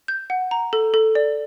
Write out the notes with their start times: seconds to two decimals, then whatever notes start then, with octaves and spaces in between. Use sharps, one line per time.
0.08 G6
0.30 F#5
0.51 A#5
0.73 A4
0.94 A4
1.15 D5